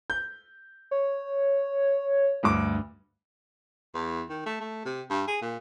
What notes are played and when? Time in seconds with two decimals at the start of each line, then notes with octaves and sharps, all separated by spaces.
0.10 G6
0.91 C#5
2.43 D2 G2 D6
3.94 E2
4.30 D#3
4.46 A3
4.60 A3
4.85 C3
5.10 G2
5.27 G#4
5.41 A#2